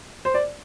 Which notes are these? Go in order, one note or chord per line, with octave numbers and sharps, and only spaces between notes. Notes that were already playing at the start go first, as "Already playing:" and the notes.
C5
D5